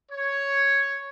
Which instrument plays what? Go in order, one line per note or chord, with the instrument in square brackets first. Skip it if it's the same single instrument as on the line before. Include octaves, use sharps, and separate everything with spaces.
[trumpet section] C#5